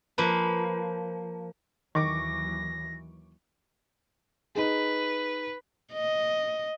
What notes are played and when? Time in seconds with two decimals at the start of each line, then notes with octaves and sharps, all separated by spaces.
0.18 F3 A#3 B4
1.95 D#2 D#3 E3 F#3 C#6 D6 A#6
4.55 D#4 G#4 B4
5.93 D#5